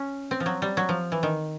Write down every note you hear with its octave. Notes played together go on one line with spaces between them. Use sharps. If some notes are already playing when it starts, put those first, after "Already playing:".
Already playing: C#4
C4
F3
F#3
G3
F#3
F3
E3
D#3